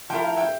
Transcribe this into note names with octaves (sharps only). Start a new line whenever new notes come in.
F3 A3 E4 A#4 G5
F5
E5 G5